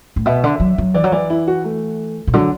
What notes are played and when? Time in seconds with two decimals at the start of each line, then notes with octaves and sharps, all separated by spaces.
0.16 A2
0.26 B2 E5
0.44 D3
0.60 F#3
0.78 F#3
0.94 E3 D5
1.04 F#3
1.12 E3 D5
1.30 E4
1.47 F#4
1.64 A3
2.27 B2
2.33 D3 F#3